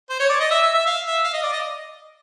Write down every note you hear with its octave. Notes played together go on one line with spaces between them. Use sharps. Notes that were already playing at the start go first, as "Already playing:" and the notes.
C5
C#5
D5
D#5
E5
E5
E5
F5
E5
F5
D#5
D5
D#5